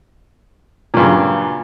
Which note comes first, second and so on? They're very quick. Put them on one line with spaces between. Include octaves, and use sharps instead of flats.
A#2 G2 C#3 F#3